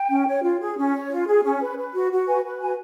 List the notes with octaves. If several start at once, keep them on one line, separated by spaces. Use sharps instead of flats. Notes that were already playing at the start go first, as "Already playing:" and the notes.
Already playing: G5
C#4
C#5
F4
G#4
C#4
C#5
F4
G#4
C#4
B4
B4
F#4
F#4
B4 G#5
B4
F#4 G#5